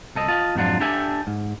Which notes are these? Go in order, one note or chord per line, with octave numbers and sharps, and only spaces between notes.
C2 A4 D#5
F4 D#5 A5
F2 G#2 F#3 D4 F4
D4 G4 A4 E5 G5 G#5
G#2